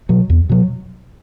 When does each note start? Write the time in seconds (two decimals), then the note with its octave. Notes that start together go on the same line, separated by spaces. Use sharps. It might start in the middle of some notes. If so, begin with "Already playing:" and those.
0.09 B2 F#3
0.30 E2
0.49 B2 F#3